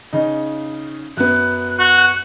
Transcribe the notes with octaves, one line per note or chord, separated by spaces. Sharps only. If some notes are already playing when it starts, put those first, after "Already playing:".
C#3 D#4
F#2 B3 F#6
F#4